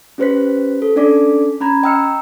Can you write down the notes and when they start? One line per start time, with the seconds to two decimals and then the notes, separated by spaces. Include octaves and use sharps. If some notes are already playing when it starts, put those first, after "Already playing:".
0.18 C#4 G4 B4 C5 F#6 B6
0.82 A4
0.96 C#4 D4 A4 D5 D6 B6
1.61 C#4 A#5 B5 G#6
1.83 D#5 G5 A#5 E6 F6 C#7